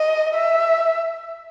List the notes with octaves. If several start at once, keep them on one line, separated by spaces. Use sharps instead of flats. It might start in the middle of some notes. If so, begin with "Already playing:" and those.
Already playing: D#5
E5